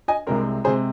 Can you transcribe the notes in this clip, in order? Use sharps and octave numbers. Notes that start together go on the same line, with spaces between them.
D#5 G#5
C2 C3 G#3 C4 A#4
C3 G#3 C4 G#4 C5